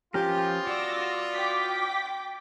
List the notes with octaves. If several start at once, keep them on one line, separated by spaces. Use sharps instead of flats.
F3 B3 C#4 F4 G4 A#4
F#4 D5 D6 E6 A#6
G5 D6 B6